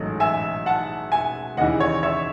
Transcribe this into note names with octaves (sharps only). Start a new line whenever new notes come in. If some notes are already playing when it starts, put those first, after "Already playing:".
Already playing: A1 G#2 F#3 A3 D#5
E5 G#5
F#5 A5
E5 G#5
D#2 C#3 E3 D#5 F#5
C#5
C#5 E5